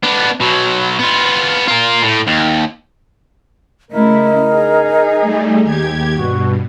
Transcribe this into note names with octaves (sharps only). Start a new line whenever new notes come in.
B3 D4
B2 F#3
B3 F4
F4 A#4
A2
D#2
C#3 A3 E4 A#4 D#5
D#4 G#4
G3 A3
D#2 G4 G#6
G2 B2 F#4